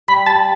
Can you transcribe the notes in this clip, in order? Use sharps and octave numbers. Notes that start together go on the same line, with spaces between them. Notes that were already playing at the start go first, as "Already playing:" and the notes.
G3 B5
G3 A5